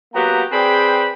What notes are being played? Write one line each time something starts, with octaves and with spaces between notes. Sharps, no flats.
F#3 A#3 B3 G4 F#5 A#5
C4 G#4 B4 D5 G5 B5